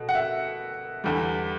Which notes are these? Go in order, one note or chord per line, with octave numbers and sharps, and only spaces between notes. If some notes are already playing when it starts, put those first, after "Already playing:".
Already playing: B2 A3
F#5
E5
E2 D3 G3